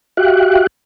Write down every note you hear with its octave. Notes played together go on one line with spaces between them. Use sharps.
F#4 G4 E5 F5 G5 F#6